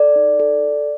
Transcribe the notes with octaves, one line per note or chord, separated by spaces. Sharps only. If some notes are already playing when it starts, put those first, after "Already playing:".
Already playing: A4 D5
D#4
A4